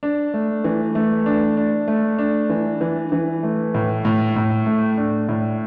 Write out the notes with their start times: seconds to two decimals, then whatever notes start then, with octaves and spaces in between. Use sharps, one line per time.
0.03 D4
0.34 A3
0.64 E3
0.95 A3
1.26 D4
1.57 D4
1.88 A3
2.19 D4
2.49 E3
2.81 E3
3.12 E3
3.43 A3
3.74 A2
4.05 A2
4.36 A2
4.66 A3
4.97 D4
5.29 A2